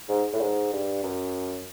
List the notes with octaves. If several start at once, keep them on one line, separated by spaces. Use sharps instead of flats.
G#2
A2
G#2
G2
F#2